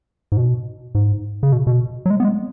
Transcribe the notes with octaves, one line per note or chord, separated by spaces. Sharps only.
G#2
B2
G#2
C#3
B2
B2
F#3
G#3
B3
G#3